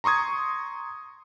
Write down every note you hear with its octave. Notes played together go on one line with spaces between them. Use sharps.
A#5 C6 C#6 D#6 G#6